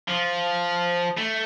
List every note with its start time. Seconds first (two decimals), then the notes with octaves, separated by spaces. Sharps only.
0.08 F3
1.17 A3